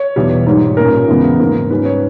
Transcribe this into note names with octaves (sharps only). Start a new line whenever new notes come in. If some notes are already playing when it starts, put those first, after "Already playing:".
Already playing: C#5
E2 B2 G3
G#2 D#3 G3 C#5
A#2 A#3 C#4 A#4
E2 C#3 G#3 B3
G#2 D#3 A#3
G#2 G3 C#4 B4
C#5